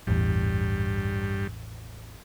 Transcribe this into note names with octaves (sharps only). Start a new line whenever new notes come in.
A1 E2 G2